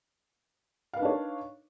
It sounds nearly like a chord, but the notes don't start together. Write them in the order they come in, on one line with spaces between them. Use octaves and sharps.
F5 B4 D#4 D4 C#5